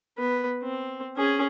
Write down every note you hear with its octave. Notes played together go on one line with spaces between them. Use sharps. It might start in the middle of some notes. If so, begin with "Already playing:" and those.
B3 B4
C4
C#4 G#4